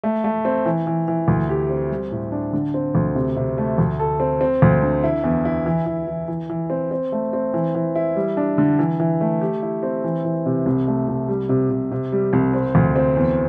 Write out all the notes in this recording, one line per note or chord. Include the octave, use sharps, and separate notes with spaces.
A3
A3
C4
E3
E3
E3
D2
G4
C4
G3
A2
D4
D3
C4
D2
C3
C3
A3
D2
A4
C4
C4
D2
D3
E4
E2
E4
E3
E3
E3
E3
E3
C4
C4
A3
C4
E3
E3
E4
G3
D4
D3
E3
E3
A3
G4
E4
C4
E3
E3
C3
C2
A3
C2
G3
C3
C3
C3
G3
C2
C4
D2
C4
E2